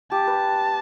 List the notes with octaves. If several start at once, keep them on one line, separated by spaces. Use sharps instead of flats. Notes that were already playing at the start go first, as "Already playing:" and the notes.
G4 A5
B4